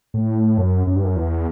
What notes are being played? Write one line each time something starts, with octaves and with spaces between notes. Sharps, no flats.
A2
F#2
F#2
G2
F#2
E2